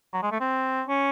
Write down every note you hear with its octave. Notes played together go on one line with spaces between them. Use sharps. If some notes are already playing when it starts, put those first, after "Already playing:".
F#3
G#3
A3
C4
C#4